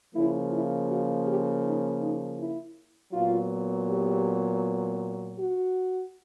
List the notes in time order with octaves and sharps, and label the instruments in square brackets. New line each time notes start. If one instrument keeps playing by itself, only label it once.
[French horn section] C#3 F3 A#3 E4
E4
F#4
G4
D#4
D#4
E4
A#2 F#3 B3 F4
G4
F#4